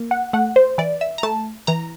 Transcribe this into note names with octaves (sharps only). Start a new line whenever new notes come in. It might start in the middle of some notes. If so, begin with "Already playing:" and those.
Already playing: A#3
F#5
A3 F#5
C5
E3 D5
E5
A#5
A3 A5
E3 A#5